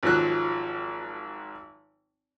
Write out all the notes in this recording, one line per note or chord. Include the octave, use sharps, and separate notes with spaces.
G#1 F3 F#3 F#6